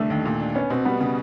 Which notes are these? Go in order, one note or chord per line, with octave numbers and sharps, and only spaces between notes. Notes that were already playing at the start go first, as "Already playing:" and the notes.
Already playing: C2 D3 A3
D#2
A#2
D4
B3 C#4
B2 C4
G3 B3
C#3 B3